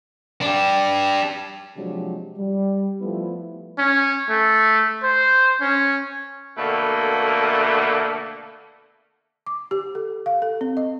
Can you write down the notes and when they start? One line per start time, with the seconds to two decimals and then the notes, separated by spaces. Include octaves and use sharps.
0.41 D4 G4
1.76 C3 F3 F#3 G#3 D4 G4
2.38 G3
3.01 F3 G3 A3 B3 E4
3.78 C#4
4.29 A3
5.03 C5
5.61 C#4
6.57 B2 D3 A3 A#3
9.47 D6
9.71 G4
9.95 A4
10.26 F5
10.42 A4
10.61 C4
10.77 D#5